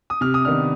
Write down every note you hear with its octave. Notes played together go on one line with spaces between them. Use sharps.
D#6
C3 F6
D#6
D#3 B3 D4 F6